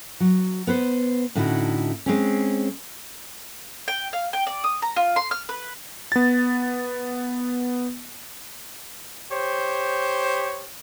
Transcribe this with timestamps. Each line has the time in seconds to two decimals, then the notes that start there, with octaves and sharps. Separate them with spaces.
0.20 F#3
0.67 B3 B4 C5
1.35 A2 D3 C#4 D#4 E4 F#4
2.06 G#3 C4 C#4
3.88 G5
4.13 F5
4.33 G5
4.47 D5
4.64 D#6
4.82 A#5
4.96 F4
5.16 C6
5.31 F6
5.49 B4
6.12 B3 A6
9.31 G4 C5 C#5